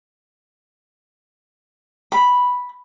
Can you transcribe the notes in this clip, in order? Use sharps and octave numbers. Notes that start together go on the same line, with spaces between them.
B5